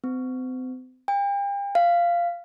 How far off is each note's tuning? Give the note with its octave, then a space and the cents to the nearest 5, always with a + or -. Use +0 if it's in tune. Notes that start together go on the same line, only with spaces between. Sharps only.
C4 -40
G5 +40
F5 -10